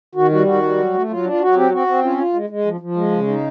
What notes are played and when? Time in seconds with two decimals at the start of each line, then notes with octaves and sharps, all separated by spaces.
0.15 D#3 F#4
0.31 G3 F#4
0.46 D#3 F#4
0.63 G3
0.78 F#3
0.94 A3
1.09 F#3 F4
1.24 D4 F4
1.40 F#3 F#4
1.56 C4 G4
1.72 C4 F#4
1.87 C4
2.02 C#4 F4
2.18 F4
2.33 G#3
2.50 G#3
2.66 F3
2.81 F3
2.96 G#3
3.11 C#3
3.28 D#4